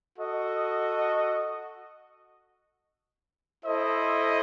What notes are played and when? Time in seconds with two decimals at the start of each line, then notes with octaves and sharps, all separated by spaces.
0.19 F#4 A4 D#5
3.65 E4 A4 C5 D#5